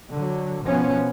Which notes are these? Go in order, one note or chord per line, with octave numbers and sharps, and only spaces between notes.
D3 F#3
B2 F3 B3 C#4